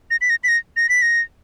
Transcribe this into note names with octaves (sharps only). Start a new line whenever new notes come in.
A#6
B6
A#6
B6
A#6
A#6
B6
A#6